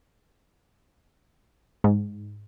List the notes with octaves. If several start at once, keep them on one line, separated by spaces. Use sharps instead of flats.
G#2